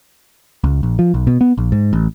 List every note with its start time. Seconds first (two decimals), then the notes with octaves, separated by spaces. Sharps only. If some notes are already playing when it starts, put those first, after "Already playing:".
0.64 C#2
0.83 A#1
0.99 F3
1.14 B1
1.27 B2
1.41 B3
1.58 A#1
1.72 G#2
1.93 A1